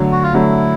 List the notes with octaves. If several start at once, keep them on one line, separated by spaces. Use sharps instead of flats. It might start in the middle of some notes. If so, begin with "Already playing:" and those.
Already playing: D3 F#3 A3
F#4
F4
D3 F#3 A3 E4